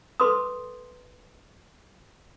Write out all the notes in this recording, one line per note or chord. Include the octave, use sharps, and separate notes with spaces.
A4 B4 C6 D6 D#6